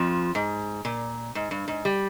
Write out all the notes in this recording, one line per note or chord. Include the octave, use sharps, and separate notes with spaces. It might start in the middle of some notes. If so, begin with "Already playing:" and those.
Already playing: F2 F3
G#2
A#2
G#2
G2
G#2
G3